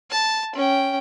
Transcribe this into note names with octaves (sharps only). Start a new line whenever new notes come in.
A5
C#4 G5